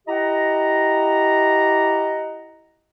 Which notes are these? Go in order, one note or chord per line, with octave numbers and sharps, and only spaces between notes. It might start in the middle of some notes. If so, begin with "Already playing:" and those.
E4 G4 D#5 F#5 A#5